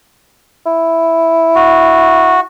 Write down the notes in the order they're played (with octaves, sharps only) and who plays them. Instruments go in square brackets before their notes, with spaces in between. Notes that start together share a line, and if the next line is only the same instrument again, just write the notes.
[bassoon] E4
[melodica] F#4